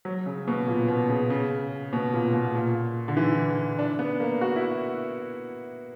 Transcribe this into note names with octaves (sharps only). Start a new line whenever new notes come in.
F#3
C#3
B2
A#2
B2
C#3
C#3
B2
A#2
B2
A#2
D3
E3
D4
B3
A#3
F#4
E4